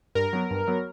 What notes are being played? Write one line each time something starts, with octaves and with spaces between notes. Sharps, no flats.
G2 A#4
F#3 B3
G2
F#3 B3